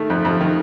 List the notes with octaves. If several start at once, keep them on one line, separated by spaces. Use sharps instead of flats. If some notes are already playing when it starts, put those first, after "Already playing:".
Already playing: D#3 A3
F2
F2
D#3